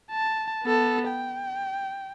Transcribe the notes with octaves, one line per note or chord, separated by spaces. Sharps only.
A5
B3 A4
G5